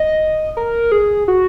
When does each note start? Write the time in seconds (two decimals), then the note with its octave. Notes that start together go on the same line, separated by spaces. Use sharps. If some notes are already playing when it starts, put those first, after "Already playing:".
Already playing: D#5
0.57 A#4
0.92 G#4
1.28 F#4